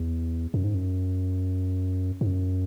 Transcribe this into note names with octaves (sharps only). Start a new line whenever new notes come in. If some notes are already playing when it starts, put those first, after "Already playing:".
Already playing: E2
F#2
G#2
F#2
G#2
F#2